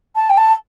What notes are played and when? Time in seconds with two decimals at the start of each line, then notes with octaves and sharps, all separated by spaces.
0.16 A5
0.30 G5
0.37 A5